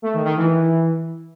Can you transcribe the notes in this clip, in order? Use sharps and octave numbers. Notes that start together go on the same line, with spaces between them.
A3
D#3
D#3
E3